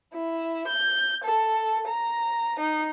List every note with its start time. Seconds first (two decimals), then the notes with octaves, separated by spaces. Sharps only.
0.14 E4
0.67 G6
1.24 A4
1.88 A#5
2.60 D#4